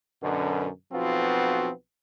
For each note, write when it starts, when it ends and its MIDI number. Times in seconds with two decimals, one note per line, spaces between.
0.23 0.68 42
0.23 0.68 47
0.23 0.68 50
0.92 1.70 35
0.92 1.70 53
0.92 1.70 59
0.92 1.70 60
0.92 1.70 65
0.92 1.70 66